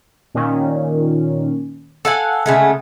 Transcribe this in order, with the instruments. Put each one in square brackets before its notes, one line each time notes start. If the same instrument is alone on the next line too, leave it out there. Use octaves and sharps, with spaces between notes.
[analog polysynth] A#2 D#3 C#4
[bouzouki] A4 F5 G#5 [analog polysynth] F#5
[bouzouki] C#3 G#3 A3